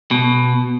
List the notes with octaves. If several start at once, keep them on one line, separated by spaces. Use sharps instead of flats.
B2